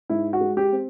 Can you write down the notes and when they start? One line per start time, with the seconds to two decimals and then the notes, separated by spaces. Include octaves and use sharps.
0.10 G#2 E4
0.33 F#4
0.41 G#3
0.57 G4
0.72 C4